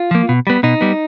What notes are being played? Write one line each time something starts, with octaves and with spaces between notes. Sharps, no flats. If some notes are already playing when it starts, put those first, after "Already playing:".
Already playing: F4
F3 A#3
B2
G3 B3
B2 D#4
G3 B3